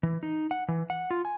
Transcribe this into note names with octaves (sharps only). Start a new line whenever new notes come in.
E3
D#4
F#5
E3
F#5
F4
G#5